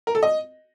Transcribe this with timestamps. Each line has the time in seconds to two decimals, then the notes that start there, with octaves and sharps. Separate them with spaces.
0.07 A#4
0.15 A4
0.23 D#5